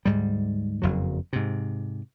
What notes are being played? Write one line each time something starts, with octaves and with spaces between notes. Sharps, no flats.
D2 G#2 G3
F#1 F2 F#3
G#2 C3